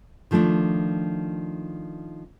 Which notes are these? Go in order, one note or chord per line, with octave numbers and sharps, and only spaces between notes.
D#3 F3 A3 C#4 D4